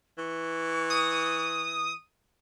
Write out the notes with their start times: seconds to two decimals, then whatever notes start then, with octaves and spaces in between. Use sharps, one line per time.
0.18 E3 C#6
0.90 D#6